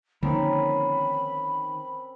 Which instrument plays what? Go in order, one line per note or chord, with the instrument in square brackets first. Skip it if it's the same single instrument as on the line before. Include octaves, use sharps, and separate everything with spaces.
[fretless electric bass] D3 F3 A#3 [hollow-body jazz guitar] D#3 [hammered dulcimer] C4 C#4 A#4 [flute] B5